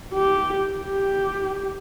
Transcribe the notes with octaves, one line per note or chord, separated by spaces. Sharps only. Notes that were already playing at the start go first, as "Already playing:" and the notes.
G4
G4